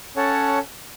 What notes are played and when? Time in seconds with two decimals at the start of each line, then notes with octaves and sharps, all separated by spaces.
0.16 C#4 A4 C#5 F#5 A5